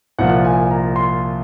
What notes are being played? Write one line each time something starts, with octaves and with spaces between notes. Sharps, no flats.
C2 A#2 F3 F#5
G#5
A#5
C6